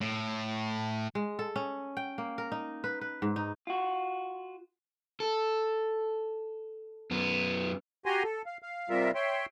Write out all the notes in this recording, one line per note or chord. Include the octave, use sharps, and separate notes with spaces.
A2
G#3
A4
C#4
G5
A#3
A#4
D#4
B4
B4
G#2
D#4
F4 F#4
A4
F#2 B3
F#4 G4 G#5 A#5 C6
A4
F5
F5
C3 G3 F4 A#4 E5
C#5 E5 G5 C6